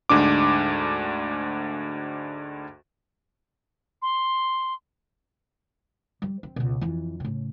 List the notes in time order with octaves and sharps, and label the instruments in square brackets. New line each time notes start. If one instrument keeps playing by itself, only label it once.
[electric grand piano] D2 G#2 D4 D6
[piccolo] C6
[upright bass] G3
C4
C#2 B2
F2 E3
A2 C#3